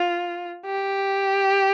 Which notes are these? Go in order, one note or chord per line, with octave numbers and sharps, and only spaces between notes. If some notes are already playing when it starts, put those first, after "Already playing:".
Already playing: F4
G4